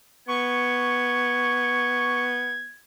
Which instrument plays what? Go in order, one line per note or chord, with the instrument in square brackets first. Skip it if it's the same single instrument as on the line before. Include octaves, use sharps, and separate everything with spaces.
[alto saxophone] B3 [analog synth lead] C#6 [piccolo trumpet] G#6